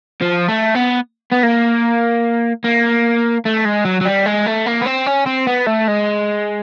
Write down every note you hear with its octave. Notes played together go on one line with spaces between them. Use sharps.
F3
A3
B3
B3
A#3
A#3
A3
G#3
F#3
F#3
G3
G#3
A3
A#3
B3
C4
C#4
C4
B3
A3
G#3